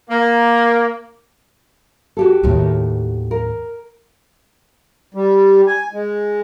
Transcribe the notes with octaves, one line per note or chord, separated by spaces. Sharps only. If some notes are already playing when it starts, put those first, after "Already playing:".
A#3
F#4 G4 A4
D#2 A2
A#4
G3
G#5
G#3